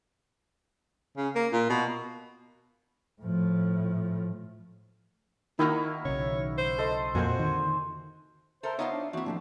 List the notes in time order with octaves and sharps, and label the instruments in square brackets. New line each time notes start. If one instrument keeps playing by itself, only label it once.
[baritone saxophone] C#3
A#3
A#2
B2
[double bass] A2 F3
[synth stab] D#3 D#4 [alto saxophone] A#3 [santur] E4 F#4 A#4
[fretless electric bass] B1 C#3 [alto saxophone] C#5
[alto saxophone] C5
[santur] A4 D#5 C6
[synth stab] F2 A#2 [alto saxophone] F#4 [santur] C5 G#5
[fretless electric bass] D3 D#3
[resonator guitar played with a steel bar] A4 A#4 [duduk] C5 [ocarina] E5
[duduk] B3 [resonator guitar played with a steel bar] D#4 F4 C5 [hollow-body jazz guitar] C#5
[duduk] D4
[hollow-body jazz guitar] E2 [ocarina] A#3 [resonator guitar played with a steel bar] C4 E4 [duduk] F#4
[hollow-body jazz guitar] A2 F3 A3 [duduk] D4